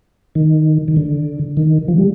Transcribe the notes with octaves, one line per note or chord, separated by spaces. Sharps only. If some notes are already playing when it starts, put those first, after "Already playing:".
D#3
D#3
D3
D#3
F3
G3